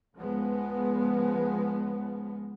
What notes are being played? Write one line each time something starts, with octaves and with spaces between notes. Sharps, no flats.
C#2 F3 G#3 B3